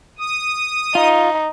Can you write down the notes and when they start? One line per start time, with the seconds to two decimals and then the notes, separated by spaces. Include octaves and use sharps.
0.19 D#6
0.95 D#4 F4